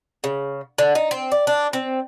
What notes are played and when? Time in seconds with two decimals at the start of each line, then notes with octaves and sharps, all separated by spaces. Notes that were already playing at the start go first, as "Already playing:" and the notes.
0.24 C#3
0.78 D3
0.95 D#4
1.11 C4
1.32 D5
1.47 D4
1.73 C4